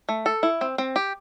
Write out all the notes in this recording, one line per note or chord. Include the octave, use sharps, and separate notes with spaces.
A3
A4
E4
C4
C4
G4